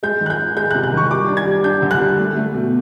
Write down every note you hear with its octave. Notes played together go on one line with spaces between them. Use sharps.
G#3 G6
D#3
F#6
G6
D#3
G#3 G6
C3 F#6
F#6
D#3 C#6
G3 D6
D4
G#6
G3
D4 G6
D3
F#6
G3
A3
A3
B2